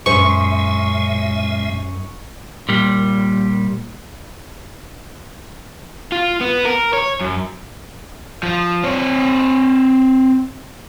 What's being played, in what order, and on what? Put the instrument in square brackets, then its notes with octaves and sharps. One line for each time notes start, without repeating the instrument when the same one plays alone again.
[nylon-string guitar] F#2 C5 [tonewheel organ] A#2 G#3 E5 [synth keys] C#6
[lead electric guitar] A#2 G3
[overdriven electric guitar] F4
B3
A#4
C#5
F#2
F3
C4 C#5